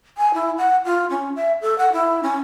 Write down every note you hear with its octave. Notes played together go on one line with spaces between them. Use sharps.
G#5
E4
F#5
F4
C#4
E5
A4
F#5
E4
C#4